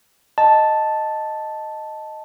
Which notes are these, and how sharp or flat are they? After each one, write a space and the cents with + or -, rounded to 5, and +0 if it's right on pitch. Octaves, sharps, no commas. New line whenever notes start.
D#5 +0 A5 +0